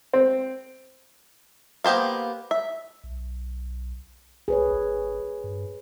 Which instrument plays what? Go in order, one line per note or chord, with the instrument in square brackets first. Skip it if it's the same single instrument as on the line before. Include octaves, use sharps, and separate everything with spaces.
[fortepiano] C4
[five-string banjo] A#3 B3 G4 C5 F5
E5
[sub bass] B1
[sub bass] C2 [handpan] G#4 B4 C#5
[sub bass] G#1
G2